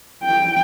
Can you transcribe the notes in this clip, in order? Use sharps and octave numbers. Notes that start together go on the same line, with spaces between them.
G5